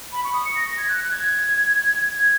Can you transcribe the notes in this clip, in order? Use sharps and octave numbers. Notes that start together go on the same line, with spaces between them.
B5
C#6
D#6
C#7
A#6
A#6
G#6
F#6
F#6
G#6
G#6